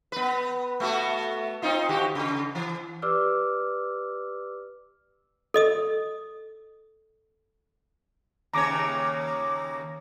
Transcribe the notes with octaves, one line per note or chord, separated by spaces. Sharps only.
B3 B4
A3 B3 F#4
C4 D#4 F4
D#3 F#4 G4
C#3
E3
G4 B4 D5 D6 E6 F6
A4 D#5 D#6
D#2 C#3 C#5 A#5 D6 A#6